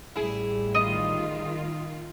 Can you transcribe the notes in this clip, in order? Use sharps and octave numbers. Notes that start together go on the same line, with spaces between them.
A1 G3 E4 G#4
D#3 F4 D#5